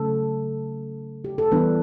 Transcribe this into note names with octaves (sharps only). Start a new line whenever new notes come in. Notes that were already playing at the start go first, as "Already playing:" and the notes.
Already playing: C#3 F#3 A3 A4
G4
A4
E3 G3 B3 D4 B4